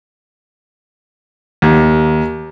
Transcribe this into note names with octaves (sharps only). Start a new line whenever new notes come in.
D#2